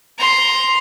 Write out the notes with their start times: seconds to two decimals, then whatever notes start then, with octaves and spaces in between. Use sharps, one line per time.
0.18 A#5 C6